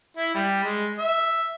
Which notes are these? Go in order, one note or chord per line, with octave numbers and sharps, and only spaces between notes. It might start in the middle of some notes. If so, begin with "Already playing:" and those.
E4
G3
G#3
E5